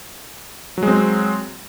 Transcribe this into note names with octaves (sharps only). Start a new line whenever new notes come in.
F#3 G#3 C4